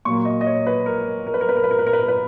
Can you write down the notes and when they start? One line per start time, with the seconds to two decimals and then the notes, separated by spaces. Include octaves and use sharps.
0.05 A#2 F#3 A#3 C#6
0.25 D#5
0.41 D#5
0.46 C#5
0.67 B4
0.86 A#4
1.27 A#4
1.34 B4
1.41 A#4
1.49 B4
1.57 A#4
1.64 B4
1.71 A#4
1.79 B4
1.87 A#4
1.93 B4
2.01 A#4
2.08 B4